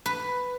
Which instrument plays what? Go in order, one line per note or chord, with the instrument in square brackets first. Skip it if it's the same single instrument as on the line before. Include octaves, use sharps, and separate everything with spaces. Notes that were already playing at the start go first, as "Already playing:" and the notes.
[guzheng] B4